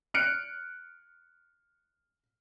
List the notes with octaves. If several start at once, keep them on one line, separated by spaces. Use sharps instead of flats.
F6 F#6 C#7 D7